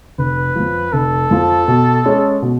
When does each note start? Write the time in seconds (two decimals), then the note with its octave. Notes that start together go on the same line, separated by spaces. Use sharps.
0.18 F1 B4
0.55 F2 F3
0.93 F1 A4
1.31 F2 F3
1.68 B2
2.04 G#3 C#4 G#4
2.42 B2